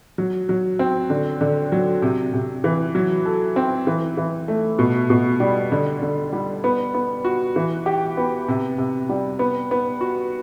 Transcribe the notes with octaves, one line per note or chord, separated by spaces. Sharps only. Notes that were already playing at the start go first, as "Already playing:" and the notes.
F#3
F#3
C4
D3
D3
F#3
C3
C3
E3
F#3
A4
C4
E3
E3
A3
B2
B2
G3
D3
D3
G3
B3
B3
F#4
E3
G4
B3
C3
C3
G3
B3
B3
F#4